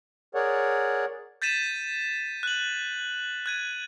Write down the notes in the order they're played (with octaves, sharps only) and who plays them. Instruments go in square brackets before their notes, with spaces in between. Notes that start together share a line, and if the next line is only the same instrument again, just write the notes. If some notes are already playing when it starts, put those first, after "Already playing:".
[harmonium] G#4 A#4 C#5 D5 F#5
[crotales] G6 A6 B6 D#7 E7
F#6 F#7
F#6 G#6 D#7